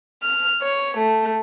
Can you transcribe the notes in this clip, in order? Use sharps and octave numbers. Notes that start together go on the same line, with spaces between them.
F6
C#5
A3